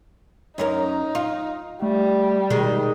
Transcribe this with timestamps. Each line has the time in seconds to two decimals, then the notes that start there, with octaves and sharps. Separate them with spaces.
0.58 F#2 C#4 D#4 A#4
1.15 F4
1.82 G3 A3
2.50 B2 D#3 G#3